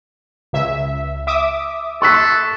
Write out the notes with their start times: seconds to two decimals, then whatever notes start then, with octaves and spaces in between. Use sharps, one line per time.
0.53 C#2 E5
1.27 E5 D6 D#6
2.02 A4 C#6 F#6 B6